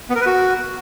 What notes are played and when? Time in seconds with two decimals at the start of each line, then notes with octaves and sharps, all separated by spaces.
0.10 B3
0.15 A#4
0.21 B4
0.26 F#4